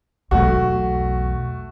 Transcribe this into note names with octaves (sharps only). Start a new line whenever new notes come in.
B1 E2 A3 F#4